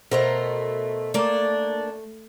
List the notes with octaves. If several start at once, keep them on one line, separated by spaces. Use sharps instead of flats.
B2 A3 A#4 C5 A#5
A3 A#3 D4